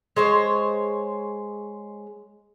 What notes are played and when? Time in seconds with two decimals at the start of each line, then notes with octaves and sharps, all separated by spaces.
0.16 G#3 C5 C#5